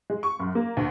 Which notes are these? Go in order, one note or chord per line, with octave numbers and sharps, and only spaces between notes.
G#3
C#6
F#2
A#3
D2